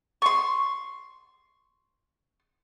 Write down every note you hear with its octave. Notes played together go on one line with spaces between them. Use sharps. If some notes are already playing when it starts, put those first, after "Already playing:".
C6 C#6